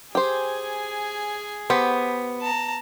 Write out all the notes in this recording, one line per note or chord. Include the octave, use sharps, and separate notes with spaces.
G4 G#4 C5 G#5
B3 G4 C5
A5 A#5